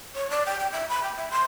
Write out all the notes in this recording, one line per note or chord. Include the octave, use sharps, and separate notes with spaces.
C#5
D5
G5
G5
E5
B5
G5
E5
C6